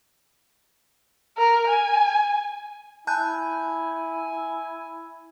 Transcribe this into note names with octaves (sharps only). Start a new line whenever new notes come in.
A#4
G#5
E4 G#5 A5 F#6 G6